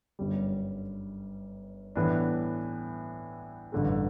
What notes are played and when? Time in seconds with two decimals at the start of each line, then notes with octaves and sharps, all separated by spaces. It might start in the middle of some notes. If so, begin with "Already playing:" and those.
0.19 G1 F#2 D3 G3
1.95 A2 E3 B3 D4
3.72 A1 G2 D3 A3